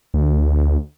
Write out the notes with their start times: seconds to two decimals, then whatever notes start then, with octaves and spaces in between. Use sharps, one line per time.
0.14 D2